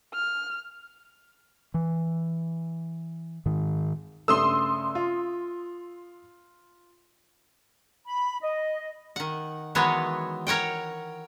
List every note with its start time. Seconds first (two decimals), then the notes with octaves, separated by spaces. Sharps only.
0.14 F6
1.74 E3
3.46 G#2 D#3
4.28 G2 C#3 A3 C6 D#6 E6
4.95 F4
8.05 B5
8.41 D#5
9.16 D#3 F#5
9.75 D#3 E3 F#3 G#3 B3 C#5
10.47 A#4 C#5 F#5 G5